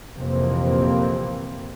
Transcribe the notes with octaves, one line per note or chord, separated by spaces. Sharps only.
A#1 F2 C3 E3 A#3 C4